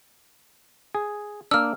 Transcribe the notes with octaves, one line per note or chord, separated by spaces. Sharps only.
G#4
A#3 D4 E6 F6